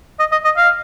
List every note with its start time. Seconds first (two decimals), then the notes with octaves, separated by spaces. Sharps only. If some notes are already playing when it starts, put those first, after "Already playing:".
0.20 D#5
0.32 D#5
0.45 D#5
0.57 F5